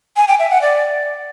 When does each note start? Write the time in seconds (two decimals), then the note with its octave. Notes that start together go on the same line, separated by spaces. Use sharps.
0.17 G#5
0.28 G5
0.39 E5
0.50 F#5
0.62 D5